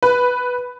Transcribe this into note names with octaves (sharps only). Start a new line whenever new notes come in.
B4